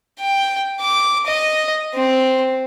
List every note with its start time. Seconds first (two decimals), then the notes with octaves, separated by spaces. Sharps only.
0.20 G5
0.80 D6
1.27 D#5
1.94 C4